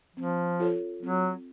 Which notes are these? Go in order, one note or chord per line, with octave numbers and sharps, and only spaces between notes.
F3 C4
F4 A4 C#5
F#3 C4